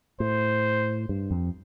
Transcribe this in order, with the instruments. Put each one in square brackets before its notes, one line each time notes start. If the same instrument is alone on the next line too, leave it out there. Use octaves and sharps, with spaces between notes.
[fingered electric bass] A2 [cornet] C5
[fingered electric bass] G2
F2